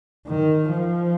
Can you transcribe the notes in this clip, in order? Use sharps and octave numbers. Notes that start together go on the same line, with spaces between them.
D#3
F3